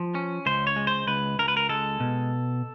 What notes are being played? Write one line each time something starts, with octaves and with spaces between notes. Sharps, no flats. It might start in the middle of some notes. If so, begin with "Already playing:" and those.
Already playing: F3
C#4
C#2 C5
C#5
G#3
C5
C#2 B4
C#2 A#4
B4
A#4
G#3 A4
B2